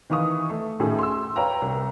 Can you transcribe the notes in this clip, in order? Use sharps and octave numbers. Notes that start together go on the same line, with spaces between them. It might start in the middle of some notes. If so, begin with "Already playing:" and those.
D#3 E3 F5 C#6 D#6
A3
A2 D#3 A3 C#4 G#4
C6 E6
B4 C#5 F5 G5 A#5
C2